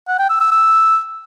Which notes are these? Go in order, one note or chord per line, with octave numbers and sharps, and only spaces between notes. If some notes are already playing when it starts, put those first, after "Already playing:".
F#5
G5
E6
E6
E6